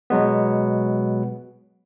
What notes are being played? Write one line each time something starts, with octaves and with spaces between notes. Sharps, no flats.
B2 F#3 G#3 B3